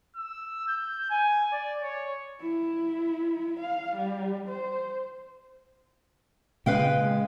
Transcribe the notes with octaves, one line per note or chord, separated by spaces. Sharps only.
E6
G6
G#5
D5
C#5
E4
F5
G3
C5
A#2 C#3 G#3 B4 F5 G5